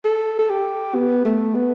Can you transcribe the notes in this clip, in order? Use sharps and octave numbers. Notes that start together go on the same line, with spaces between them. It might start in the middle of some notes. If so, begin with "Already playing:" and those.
A4
A4
G4
B3
A3
B3